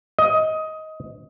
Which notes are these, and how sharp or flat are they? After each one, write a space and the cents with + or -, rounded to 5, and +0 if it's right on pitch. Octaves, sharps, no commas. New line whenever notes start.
D#5 +15